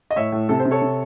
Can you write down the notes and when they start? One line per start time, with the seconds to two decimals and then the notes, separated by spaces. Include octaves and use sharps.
0.11 D#5
0.16 A2 C#5 E5
0.32 A2
0.49 C3 A4
0.59 C5
0.65 C3
0.71 A4 C#5
0.82 C3